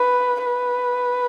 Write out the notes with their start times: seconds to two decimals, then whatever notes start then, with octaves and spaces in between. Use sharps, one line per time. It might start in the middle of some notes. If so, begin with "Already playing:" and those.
Already playing: B4
0.45 B4